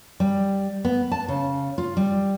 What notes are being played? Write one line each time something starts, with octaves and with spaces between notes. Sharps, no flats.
G3
B3
A5
C#3
F4
G3